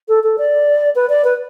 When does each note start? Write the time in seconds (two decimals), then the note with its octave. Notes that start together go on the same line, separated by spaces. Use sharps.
0.08 A4
0.23 A4
0.38 D5
0.96 B4
1.09 D5
1.24 B4